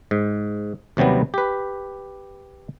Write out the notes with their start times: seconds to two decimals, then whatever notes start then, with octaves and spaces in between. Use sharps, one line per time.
0.11 G#2
0.97 D#2 C3 F#3 G3 B3
1.34 G4 B4